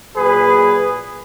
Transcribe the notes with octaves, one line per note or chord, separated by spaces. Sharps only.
A#2 F#3 G#4 B4